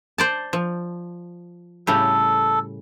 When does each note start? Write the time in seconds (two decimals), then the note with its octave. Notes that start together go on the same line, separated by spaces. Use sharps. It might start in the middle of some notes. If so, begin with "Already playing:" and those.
0.18 C5 D5 A5
0.53 F3
1.87 A2 C#3 G3 A4